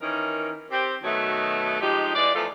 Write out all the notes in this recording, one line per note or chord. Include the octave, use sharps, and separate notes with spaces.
D#3 E3 C#4 A#4
C4 G4
B2 D#3 F#3 A3
F3 G#3 D#4 G4
E3 G#3 D5
E2 F3 A3 F4 A4